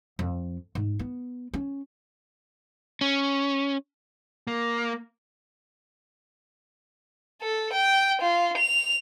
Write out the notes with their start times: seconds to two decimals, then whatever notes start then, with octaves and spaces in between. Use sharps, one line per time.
0.19 F2
0.75 G#2
0.99 B3
1.54 C#4
3.01 C#4
4.47 A#3
7.42 A4
7.73 G5
8.21 F4
8.57 F7